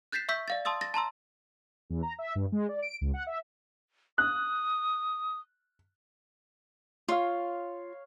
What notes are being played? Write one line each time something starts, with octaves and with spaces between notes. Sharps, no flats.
F#6 G6 A6 B6 C7 E7
E5 C#6 E6 G6 B6
D5 F5 A6
A5 C6 D#6 E6 A6
A6 A#6
A5 A#5 C6 E6
E2
A#5
E5
G2
G#3
D5
D7
C#2
F#5
E5
D#6 F#6
F4 C#5 F5